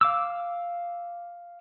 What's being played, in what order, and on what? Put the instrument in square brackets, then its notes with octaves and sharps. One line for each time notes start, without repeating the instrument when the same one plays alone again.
[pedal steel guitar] F5 D6 E6